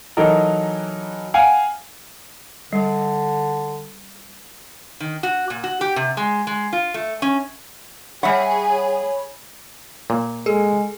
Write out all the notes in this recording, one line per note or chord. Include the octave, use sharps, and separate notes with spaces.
E3 F#3 D#4 A4 A#4
F5 F#5 G#5
D3 G3
D#3
F#4
A#2
F#4
G4
C3
G#3
G#3
F4
A3
C#4
G3 G#4 C#5 E5 F#5 B5
A#2
G#3 G#4 A4